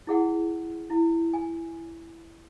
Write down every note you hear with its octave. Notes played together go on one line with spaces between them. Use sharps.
E4 G#4 F#5
E4
G#5